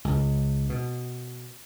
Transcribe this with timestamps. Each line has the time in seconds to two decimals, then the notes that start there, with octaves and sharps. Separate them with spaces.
0.05 C#2
0.70 B2